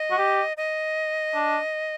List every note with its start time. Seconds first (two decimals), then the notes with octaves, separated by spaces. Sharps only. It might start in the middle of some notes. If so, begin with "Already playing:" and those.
Already playing: D#5
0.11 F#4
0.18 G4
0.57 D#5
1.34 D4